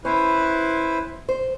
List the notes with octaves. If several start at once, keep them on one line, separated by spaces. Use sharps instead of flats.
C#4 E4 B4 C5
C5